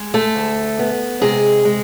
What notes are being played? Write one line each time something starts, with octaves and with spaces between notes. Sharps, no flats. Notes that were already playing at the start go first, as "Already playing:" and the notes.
Already playing: G#3
A3 A4
D2
B3
C3 G#3 G#4
G#3